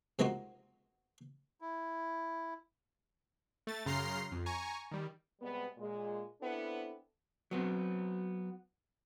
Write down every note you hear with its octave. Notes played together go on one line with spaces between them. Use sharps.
C3 G#3 A#3 D#4 F4 F#4
E4
A3 A6
F#2 C#3 A#5 C6 F6 C7
F2
G#5 A#5 C#6
D#3 G3
C3 G3 G#3 B3
A#2 G#3
B3 C4 D4 E4 A4
F#3 B3 C4